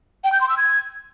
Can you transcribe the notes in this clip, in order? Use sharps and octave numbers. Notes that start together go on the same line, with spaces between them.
G5
G6
C6
E6
G#6